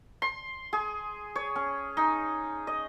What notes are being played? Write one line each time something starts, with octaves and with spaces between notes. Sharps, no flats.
C6
G#4
C#5
C#4
D#4
D#5